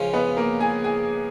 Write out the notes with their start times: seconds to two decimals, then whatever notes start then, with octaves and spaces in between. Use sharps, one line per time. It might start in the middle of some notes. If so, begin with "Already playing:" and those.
Already playing: C#2 C#3 F3
0.14 B3 B4
0.37 A#3 A#4
0.60 G#4 G#5
0.84 G#4 G#5